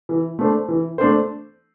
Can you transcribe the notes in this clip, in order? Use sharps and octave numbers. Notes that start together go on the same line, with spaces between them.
E3
A3 D4 C5
E3
A3 D4 C5